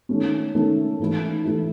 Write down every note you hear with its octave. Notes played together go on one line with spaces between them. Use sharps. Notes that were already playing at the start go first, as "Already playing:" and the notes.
D#3 A3 C#4
D#3 A3 C#4
G#2 E3 A3 E4
E3 A3 E4